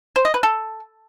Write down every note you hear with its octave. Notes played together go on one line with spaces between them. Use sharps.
C5
D#5
B4
A4